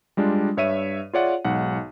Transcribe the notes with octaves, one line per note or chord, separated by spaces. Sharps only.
G3 G#3 D4 F4
G2 C#5 E5 D#7
F4 G#4 C#5 D5 E5 F#5
B1 G#2 F#5